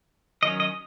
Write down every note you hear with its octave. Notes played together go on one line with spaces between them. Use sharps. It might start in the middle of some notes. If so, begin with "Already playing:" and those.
D#3 F#3 C#4 D#5
D#5